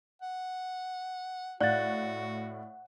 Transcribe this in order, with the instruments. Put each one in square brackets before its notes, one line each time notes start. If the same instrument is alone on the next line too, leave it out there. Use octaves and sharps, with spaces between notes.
[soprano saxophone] F#5
[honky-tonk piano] A2 F#6 [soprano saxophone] F#4 [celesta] D5 F5 A6 [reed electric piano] F#5